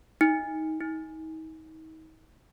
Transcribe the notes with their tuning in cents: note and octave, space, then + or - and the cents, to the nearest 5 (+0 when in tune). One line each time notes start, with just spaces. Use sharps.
D#4 +15
D#4 +35